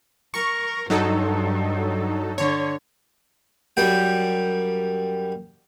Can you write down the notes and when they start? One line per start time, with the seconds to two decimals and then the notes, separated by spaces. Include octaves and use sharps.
0.34 A#4 C#6
0.90 G2 F#3 D#4 A4
2.38 D3 C#5
3.77 F#2 G3 G5